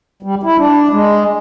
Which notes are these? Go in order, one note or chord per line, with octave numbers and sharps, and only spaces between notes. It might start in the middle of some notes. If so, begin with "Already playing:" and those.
G3
E4
D4
G#3